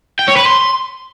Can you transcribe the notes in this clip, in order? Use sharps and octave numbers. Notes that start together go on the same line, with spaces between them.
G5
C#5
B4
C6